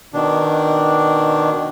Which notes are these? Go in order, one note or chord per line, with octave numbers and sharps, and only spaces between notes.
B2 D#3 D4